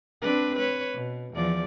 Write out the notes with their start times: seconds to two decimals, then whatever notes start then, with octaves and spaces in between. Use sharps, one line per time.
0.22 C4 D4 B4
0.56 B4 C#5
0.94 B2
1.34 E2 F3 D5